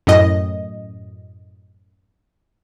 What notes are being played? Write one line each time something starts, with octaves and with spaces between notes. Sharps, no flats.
F#2 A2 D#5